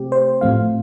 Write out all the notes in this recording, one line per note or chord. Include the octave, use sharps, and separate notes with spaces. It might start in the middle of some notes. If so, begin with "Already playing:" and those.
Already playing: C3 A3 C4 G4
C5
A2 F3 A3 C4 F5